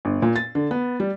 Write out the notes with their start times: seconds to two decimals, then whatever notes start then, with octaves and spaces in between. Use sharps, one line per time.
0.05 G1
0.22 A#2
0.36 A6
0.55 D3
0.71 B3
1.00 G3